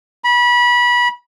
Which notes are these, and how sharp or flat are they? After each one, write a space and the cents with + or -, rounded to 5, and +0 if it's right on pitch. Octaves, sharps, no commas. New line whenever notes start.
B5 -25